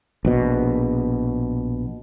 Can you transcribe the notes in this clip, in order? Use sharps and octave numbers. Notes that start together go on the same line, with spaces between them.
A#1 B2